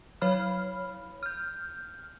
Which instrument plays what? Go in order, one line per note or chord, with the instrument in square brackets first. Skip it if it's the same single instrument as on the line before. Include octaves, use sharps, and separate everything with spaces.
[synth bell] F#3 C#5 B5 F6
F6 G6